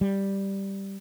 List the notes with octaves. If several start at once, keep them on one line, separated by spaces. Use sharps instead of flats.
G3